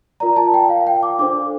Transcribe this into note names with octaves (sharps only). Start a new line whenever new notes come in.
F4 A#4 D5 A#5
A5
G5
F5
F5
G5
D6
D4 A4 C5 D6